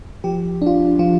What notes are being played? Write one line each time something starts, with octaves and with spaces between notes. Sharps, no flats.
F3 G4
D4 F4
F3 F4